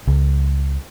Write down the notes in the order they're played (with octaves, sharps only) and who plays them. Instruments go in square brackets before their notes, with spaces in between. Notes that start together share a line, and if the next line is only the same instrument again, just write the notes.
[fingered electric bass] C#2